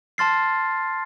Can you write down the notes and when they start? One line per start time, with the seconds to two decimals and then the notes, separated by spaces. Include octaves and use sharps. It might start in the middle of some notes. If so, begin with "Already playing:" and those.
0.18 A5 C6 F6 A6 C7